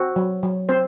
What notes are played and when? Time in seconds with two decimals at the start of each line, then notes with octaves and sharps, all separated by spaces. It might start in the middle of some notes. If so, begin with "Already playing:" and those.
Already playing: C4 F#4
0.16 F#3
0.43 F#3
0.69 C4 C5